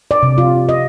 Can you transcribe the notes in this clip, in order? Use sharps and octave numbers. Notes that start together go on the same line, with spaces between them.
D5
C3
F4
D#5